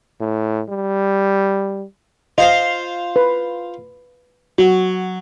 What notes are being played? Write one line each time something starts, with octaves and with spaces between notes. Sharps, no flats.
A2
G3
F4 C5 D#5 F5
B4
F#3 F#4